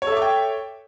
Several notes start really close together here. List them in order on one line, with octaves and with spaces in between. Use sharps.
C#5 A4 E5 D6 G5